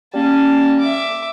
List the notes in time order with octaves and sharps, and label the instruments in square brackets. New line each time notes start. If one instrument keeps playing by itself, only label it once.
[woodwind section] G3 A#3 C#4 [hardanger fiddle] A5
[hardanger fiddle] E5 D6